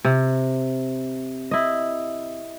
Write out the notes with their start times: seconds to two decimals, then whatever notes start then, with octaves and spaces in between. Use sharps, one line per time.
0.05 C3
1.51 E4 D#5